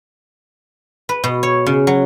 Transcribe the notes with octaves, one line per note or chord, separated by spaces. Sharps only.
B4
B2
C#5
C#3
F#3